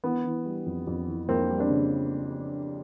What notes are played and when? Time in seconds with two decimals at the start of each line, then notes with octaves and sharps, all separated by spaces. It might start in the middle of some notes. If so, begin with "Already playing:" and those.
0.04 E3 B3
0.24 E3
0.45 G3
0.66 F2
0.87 F2
1.07 E3
1.29 F2 A#3 C4
1.50 G3
1.60 C4 D4
1.70 C#3